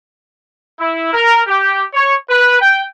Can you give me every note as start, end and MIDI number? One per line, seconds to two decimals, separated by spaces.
0.80 1.14 64
1.14 1.42 70
1.47 1.80 67
1.94 2.16 73
2.29 2.57 71
2.60 2.82 79